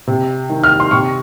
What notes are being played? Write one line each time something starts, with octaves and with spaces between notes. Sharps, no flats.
C3
D#3
F6
C6
C3 C#6